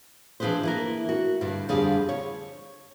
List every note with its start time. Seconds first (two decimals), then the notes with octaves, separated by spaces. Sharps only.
0.40 E3 F3 D4 G#4 B4 C5
0.63 E3 A#3 A#4
1.09 F#4
1.41 G2 D3
1.69 F2 D3 G3 G#4 F5
2.09 C#5